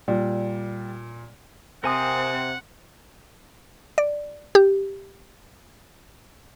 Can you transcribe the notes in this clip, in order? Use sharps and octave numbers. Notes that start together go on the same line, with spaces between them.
A#2 G3
C3 C4 A#4 F#5 G#5 D#6
D5
G4